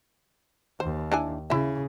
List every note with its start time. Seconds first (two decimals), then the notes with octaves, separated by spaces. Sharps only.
0.80 D#2 C5
1.12 D4 E4 G#5
1.50 C#3 E4 E5